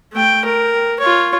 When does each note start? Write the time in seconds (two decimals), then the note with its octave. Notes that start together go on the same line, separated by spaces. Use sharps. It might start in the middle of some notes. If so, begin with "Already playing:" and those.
0.13 A3 G5
0.45 A#4
1.00 F4 C#5